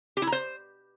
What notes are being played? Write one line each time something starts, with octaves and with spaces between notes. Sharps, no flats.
G4
E4
A#5
C5